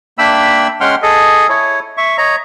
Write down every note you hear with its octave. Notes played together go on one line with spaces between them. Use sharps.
A#3 D4 E5 G5 B5 E6
G#3 C#4 F#5 G5 C6 F6
G#4 A4 D#5
E4 C#5
E5 C#6
C#5 D#5 A#5